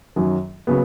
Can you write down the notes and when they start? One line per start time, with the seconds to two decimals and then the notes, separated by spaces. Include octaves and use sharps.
0.16 F#2 D#3 F#3
0.67 C#3 F#3 B3